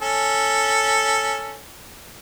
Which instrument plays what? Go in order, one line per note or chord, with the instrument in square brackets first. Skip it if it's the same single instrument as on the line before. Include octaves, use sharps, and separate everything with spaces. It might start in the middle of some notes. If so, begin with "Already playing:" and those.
[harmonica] C#4 A4